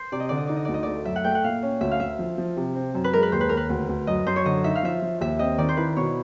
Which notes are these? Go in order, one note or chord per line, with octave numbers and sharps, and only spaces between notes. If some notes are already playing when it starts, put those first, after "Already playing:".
Already playing: C5
C3 D5
D#5
D3 D5
D#5
D#4 D5
D#5
D2 D5
D#5
A3 D5
F#2 E5
F#5
A3 G5
F#5
A#2 F5
C#4
D2 E5
F5
D2 E5
F3
F3
C3
C4
F#2
B4
G#3 A#4
B4
D#2 C5
B4
D#2 A#4
B4
D2
D2
F#2 D#5
F#2 C5
C#5
D3 D#5
D#4 E5
F5
F3 E5
F3
D#2 E5
C4 D#5
D#3 D5
C5
E4 B4
B2 C#5